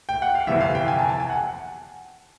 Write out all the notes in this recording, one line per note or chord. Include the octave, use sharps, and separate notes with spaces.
G5
F#5
F5
G1 F2 C3 E3 E5
F5
G5
G#5
A5
A5
G#5
F#5